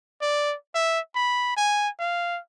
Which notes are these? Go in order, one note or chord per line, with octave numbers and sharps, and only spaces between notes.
D5
E5
B5
G#5
F5